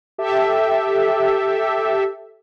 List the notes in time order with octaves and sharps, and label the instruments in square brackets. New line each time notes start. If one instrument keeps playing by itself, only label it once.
[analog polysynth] G4 A4 E5